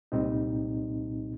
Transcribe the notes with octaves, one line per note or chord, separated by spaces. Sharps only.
C2 A#2 G3 C4 D#4